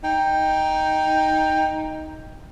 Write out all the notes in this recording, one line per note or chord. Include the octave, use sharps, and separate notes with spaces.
D#4 G5